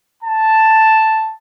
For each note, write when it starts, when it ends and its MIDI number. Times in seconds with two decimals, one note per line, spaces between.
0.23 1.32 81